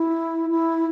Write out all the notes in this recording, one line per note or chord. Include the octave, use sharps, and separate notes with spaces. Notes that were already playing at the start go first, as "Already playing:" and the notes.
Already playing: E4
E4